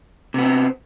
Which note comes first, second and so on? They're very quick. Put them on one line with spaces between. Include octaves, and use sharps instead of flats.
C3 B3 C4